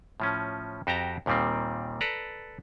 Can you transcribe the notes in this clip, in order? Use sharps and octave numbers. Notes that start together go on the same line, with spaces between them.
A2 F3 C#4
F2 F#4 G4 G5 A5 A#5
D#2 A#2 D#3 G3 C4
A4 B4 D5 A#5